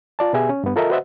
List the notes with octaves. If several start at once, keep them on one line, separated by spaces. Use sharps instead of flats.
F4 D5 A5
B2 B3 G4 G#4 E5 G#5
C#4
G2 B3
F4 A4 A#4 D#5 E5
F#4 B4 C5 D#5 E5 F#5